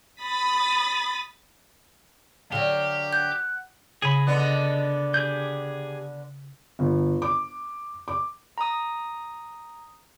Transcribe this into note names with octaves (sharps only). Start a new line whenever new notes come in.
B5 D#6 A6 B6
D3 F#3 G4 F5
F#5 G6
C#3 G#4 B5 A#6 D7
D3 B3 D4 D#5
G4 G#4 G6
G1
D6
D6
A#5 D#6